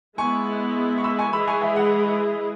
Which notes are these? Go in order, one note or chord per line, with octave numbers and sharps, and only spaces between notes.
G#3 B3 E4 G#5 C#6
C#6
B5 E6
G#5 C#6
E3 G#3 E4 G#4 B5 E6
G#5 C#6
E5 G#5
F#5